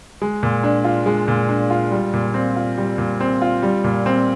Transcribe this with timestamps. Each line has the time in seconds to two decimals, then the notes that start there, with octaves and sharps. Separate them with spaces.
0.22 G#3
0.43 A#2
0.64 D4
0.85 F4
1.06 G#3
1.28 A#2
1.49 D4
1.70 F4
1.91 G3
2.13 A#2
2.34 C4
2.56 F4
2.78 G3
2.98 A#2
3.21 C4
3.42 F4
3.62 G3
3.84 A#2
4.06 C4